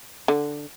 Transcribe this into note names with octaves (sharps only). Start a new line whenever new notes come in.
D3